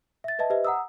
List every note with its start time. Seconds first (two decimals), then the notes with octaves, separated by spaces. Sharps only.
0.24 E5 A6
0.39 B4 D#5 E5 A5
0.50 G4 B4 C5 D#5 E5
0.65 F#5 A#5 D#6 E6